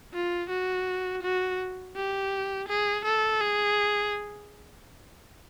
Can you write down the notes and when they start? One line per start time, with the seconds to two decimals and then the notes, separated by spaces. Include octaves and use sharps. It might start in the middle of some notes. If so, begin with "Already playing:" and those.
0.14 F4
0.50 F#4
1.22 F#4
1.96 G4
2.68 G#4
3.05 A4
3.41 G#4